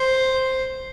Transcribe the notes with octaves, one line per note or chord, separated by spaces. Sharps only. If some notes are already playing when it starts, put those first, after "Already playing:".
Already playing: C5